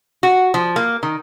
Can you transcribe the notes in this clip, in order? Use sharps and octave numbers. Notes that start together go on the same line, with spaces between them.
F#4
F3
A#3
D#3